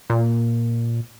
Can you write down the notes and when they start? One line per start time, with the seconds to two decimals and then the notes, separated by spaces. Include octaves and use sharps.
0.10 A#2